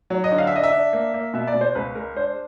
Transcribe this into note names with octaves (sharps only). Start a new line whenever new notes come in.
F#3
D#5
D3
F5
E5
D4 D#5
E5
D4
A#3
A#3
B2 E5
D5
B2
C5
C#2 B4
G#3 A#4
D4 C5